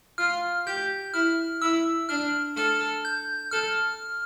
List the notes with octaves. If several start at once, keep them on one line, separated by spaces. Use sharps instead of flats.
F4 F6
G4 G6
E4 F6
E4 E6
D4 F6
A4 F6
G6
A4 F6